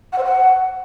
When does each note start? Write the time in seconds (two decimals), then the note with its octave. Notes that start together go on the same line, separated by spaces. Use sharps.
0.12 F#5
0.18 C5
0.24 F#5